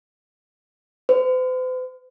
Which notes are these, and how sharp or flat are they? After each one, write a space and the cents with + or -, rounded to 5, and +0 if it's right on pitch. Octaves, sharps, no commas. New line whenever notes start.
C5 -45